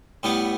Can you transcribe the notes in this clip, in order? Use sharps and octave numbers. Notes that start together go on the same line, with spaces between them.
A2 G3 B3